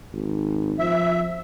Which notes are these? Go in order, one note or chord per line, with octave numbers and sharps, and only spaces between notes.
G#1
F3 E5